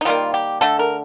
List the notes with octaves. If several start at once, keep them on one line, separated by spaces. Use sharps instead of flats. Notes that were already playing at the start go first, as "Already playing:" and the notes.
D#4
D#3 G3 A#3 F4
G4
D3 A3 A4
A#4